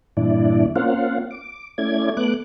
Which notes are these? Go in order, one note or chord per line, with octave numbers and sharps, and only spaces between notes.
G2 A#2 E3 D4 E4 D5
A#3 C4 C#4 F4 F5 F#5
D6
A3 C#4 E4 D5 G#6
A3 B3 D6 F#6